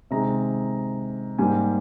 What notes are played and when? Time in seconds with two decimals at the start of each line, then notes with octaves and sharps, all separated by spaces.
0.11 C3 D#3 G#3 A#5
1.38 G#2 G3 A#3 G#5